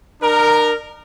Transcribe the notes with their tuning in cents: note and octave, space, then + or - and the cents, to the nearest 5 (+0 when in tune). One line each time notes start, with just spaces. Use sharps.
D4 +45 A#4 +0